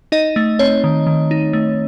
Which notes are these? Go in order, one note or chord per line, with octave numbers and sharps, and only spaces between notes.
D#4 D#5
A3
C4 C#5
D#3
D#3
D#4
A3